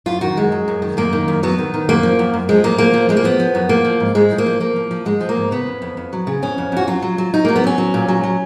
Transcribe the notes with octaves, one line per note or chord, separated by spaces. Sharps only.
F#2 F4
D#3 F#4
F#2 G#3
F#3
F#2
D#3
F#2 A#3
D#3
F#2
F#3 B3
D#3
D#3
F#2 A#3
F3
F#2
F#2
F3 G#3
F#2 A#3
F3 A#3
F3
F3 G#3
A#3
F3 B3
F3
F#2
F3 A#3
F3
G#2
G#2 G#3
F3
A#3
F3
F3 A#3
F3
F3
G#2 G#3
F3
A#3
G#2
C#3 B3
F2
F2
F2
F#3
C#3
F2 C#4
F2
F2 F#4
F#3 F4
F#3
F#3
F#3 D#4
F#3 A#3
B3
F#3 C#4
F#3
A#2
F#3
F#3